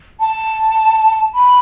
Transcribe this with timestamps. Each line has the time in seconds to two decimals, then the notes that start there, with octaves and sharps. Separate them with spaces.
0.20 A5
1.35 B5